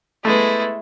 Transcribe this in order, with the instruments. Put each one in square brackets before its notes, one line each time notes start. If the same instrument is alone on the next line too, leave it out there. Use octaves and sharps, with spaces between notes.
[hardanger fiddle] G#3 E4 [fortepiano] A3 B3